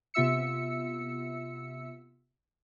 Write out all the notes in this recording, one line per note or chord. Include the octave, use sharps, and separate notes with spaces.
C3 B3 F4 E5 E6 C#7